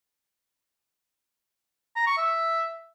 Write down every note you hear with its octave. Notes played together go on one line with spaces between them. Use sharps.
A#5
C#6
E5